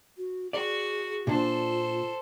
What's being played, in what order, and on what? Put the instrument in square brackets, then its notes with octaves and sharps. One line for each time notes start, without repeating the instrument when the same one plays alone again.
[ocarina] F#4
[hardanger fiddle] F#4 [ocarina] G#4 [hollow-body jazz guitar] D5
[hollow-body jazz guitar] A#2 D4 [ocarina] F4 [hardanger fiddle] A4 C5